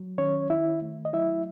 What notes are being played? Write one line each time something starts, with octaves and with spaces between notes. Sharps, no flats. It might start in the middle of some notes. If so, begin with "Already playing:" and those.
Already playing: F#3
D#3 C#4 C#5
D#3 E4 E5
A3
D#5
F#3 E4 E5